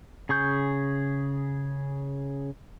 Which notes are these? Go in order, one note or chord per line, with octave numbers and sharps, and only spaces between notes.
C#3 G#4 C#6 G6